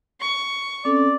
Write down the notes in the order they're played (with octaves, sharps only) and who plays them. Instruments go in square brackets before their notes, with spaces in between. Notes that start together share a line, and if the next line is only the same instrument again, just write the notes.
[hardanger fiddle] C#6
[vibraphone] C4 C#4 A4 [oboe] D5